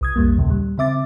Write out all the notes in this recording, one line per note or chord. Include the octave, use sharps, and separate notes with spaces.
C2 D#6 G#6
B1 F2 G3 A#3
D#2 A#2 C#3
G3
C#3 C4 E5 D6 A6